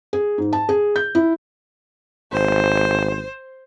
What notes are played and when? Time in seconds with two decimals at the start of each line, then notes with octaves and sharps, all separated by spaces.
0.13 G#4
0.38 G#2
0.53 A5
0.69 G#4
0.96 G6
1.15 E4
2.33 G#1 C5